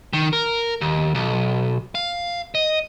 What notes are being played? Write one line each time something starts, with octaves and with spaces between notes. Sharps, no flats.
D#3
A#4
D#2
B1
F5
D#5